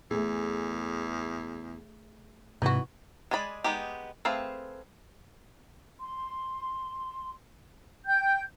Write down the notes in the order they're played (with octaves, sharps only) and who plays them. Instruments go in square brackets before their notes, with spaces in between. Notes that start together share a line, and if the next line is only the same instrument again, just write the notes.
[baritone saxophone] E2 [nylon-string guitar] A3 G#4
[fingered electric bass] G#2 C3 [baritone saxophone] E3 [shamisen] D#4 F#4
[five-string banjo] G#3 G#4 D5 B5
G#3 B3 D#4 G4
A3 C4 G#4 B4 F5
[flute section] C6
G5 G6